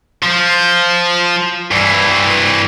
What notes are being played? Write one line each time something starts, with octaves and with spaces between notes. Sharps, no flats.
F3
G2 E3